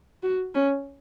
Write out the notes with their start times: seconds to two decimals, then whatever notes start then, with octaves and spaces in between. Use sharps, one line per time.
0.23 F#4
0.55 C#4